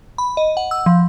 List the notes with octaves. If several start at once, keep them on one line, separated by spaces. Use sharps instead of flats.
B5
D#5
F#5
E6
F3